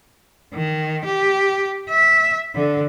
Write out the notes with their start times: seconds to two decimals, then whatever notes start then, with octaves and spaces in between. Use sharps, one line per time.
0.54 D#3
1.05 G4
1.90 E5
2.55 D3